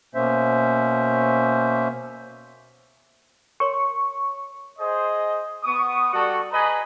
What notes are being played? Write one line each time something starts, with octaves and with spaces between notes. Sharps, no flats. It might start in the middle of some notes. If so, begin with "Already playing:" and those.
B2 A#3 C#4 C5 E5
A#4 C#5 C6 C#6
G#4 C5 D#5
B3 C#6 D#6
G3 F#4 A4 D5 C#6
G#4 B4 D#5 G#5 A#5 B5